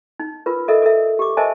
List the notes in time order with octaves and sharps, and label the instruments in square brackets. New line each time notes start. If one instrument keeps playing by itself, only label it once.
[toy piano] D#4
F4 A#4 B4
A4 A#4 D#5 E5
A4 A#4 E5
G4 D6
A#4 C5 D#5 E5 G#5 A5